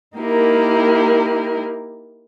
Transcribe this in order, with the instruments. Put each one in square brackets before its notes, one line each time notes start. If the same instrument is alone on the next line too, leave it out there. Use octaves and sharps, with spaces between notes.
[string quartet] A#3 D#4 E4 G4 A#4